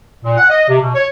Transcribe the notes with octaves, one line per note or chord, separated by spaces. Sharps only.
A#2
F#5
D#5
C3
B2
C#5